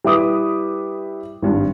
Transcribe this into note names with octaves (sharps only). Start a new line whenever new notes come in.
G3 E4 B4 D6 D#6
G#1 G2